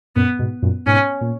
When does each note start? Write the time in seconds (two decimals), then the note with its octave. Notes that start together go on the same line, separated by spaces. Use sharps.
0.16 F#2 A#2 B3
0.39 G#2 B2
0.62 F#2 A#2
0.86 G#2 B2 C#4
1.21 A#2